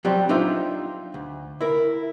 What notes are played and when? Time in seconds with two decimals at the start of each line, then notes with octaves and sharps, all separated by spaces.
0.05 F#3 G3 C4 C5 D5
0.29 D4 D#4 F4 C5 E5
1.14 D2
1.61 E4 A#4